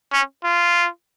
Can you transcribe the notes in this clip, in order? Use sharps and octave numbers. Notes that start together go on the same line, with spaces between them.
C#4
F4